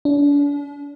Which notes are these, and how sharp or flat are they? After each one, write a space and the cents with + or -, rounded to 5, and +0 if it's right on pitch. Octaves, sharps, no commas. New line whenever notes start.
D4 -40